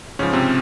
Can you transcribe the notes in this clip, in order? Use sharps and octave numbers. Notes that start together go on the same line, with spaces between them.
G#2 C#3 F3 C#4
C3 C4